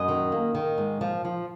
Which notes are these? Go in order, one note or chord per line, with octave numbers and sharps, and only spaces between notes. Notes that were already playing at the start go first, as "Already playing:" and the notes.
Already playing: F#2 D#5
D#3
A#3
D#3
G#2
F3
F3